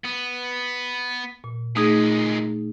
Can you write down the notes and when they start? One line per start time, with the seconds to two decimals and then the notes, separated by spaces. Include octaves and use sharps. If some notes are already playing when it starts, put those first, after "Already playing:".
0.04 B3
1.44 A#2
1.76 A#2 G#3 A3 D#4 G#4